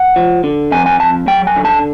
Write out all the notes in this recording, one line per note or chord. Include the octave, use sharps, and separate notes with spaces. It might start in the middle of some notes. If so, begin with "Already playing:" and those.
Already playing: F#5
F3
D3
F2 G#5
G#5
F2 A5
F#3 G5
G#5
D3
A5